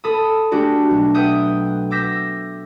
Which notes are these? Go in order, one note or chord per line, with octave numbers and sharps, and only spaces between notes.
A4 B5 D#6
A3 C#4 D4 F#4 G4 D5
B1 F#4
B4 E5 F#5 G5 D#6 G6
D6 E6 G6 A#6 B6 E7